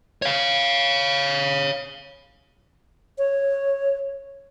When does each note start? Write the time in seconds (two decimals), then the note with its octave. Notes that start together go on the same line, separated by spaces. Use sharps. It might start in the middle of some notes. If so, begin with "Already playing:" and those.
0.22 C#5 F5
3.18 C#5